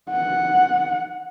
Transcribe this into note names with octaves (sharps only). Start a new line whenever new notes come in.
F#5